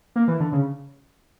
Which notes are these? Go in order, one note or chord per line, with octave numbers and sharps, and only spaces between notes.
A#3
E3
D3
C#3